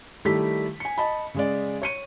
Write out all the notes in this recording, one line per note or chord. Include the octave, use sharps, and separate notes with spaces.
D#3 G3 A3 E4 G4 B6
G#5 C#7
D#5 A5 B5
C#3 G#3 D5
C#5 C#7 D#7